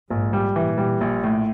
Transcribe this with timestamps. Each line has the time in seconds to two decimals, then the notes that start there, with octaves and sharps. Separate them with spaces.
0.10 A#1 G#2
0.33 G3
0.56 A#2 E3
0.78 G3
1.01 A#1
1.24 A2